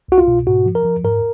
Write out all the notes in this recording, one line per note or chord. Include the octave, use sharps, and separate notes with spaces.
C2 F#4
F4
B2
G#2 F#4
F3
A#4
F3
G#2 A#4